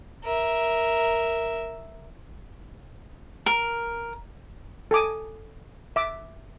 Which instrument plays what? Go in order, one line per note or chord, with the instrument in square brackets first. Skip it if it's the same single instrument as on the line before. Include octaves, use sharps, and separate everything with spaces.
[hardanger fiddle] A#4 E5
[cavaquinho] A#4
[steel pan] A4 G#5 D6 D#6
E5 D6